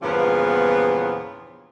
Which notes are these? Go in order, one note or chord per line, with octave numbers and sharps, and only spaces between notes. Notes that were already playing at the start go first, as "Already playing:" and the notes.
E2 G2 A#2 C#3 F3 B3